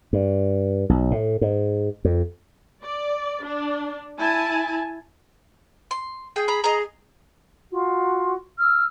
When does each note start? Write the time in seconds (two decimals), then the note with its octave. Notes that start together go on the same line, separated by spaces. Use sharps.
0.13 G2
0.89 B1
1.11 A2
1.41 G#2
2.05 F2
2.83 D5
3.44 D4
4.18 E4 G#5 A5
5.91 C6
6.36 G#4 G5
6.48 A#5 B5
6.64 G#4 D#5 A#5
7.71 F4 F#4
8.59 E6 F6